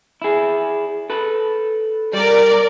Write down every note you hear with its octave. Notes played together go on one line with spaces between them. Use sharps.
E4 G#4
A4 B4
G3 A#4 D5